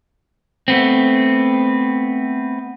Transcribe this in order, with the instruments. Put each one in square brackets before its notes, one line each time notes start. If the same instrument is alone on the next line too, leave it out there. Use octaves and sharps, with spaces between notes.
[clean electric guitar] A3 B3 C4